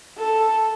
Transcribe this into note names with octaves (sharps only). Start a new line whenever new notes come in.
A4